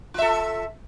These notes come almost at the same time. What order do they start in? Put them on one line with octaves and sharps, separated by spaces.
F4 E5 A4